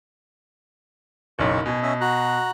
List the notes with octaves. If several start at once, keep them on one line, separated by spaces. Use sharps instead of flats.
F#1 B1 C#6
B2 G#5
C#4 D#5 E5
F#4 A#5 F#6